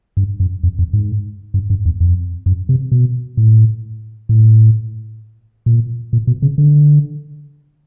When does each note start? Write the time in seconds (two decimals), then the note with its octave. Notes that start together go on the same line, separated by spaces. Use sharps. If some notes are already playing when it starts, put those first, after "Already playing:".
0.17 G2
0.40 F#2
0.63 F2
0.79 F2
0.93 G#2
1.54 G2
1.70 G2
1.85 E2
2.00 F2
2.46 F#2
2.69 C3
2.92 B2
3.37 A2
4.29 A2
5.66 A#2
6.13 A#2
6.27 B2
6.42 C#3
6.58 D3